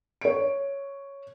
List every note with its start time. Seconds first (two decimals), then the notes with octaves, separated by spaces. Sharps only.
0.21 C#5 D7